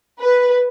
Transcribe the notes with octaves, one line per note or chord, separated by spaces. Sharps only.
B4